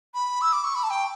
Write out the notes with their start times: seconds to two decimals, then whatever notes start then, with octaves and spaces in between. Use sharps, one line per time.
0.14 B5
0.42 E6
0.53 D6
0.64 C#6
0.75 B5
0.83 A5
0.90 G5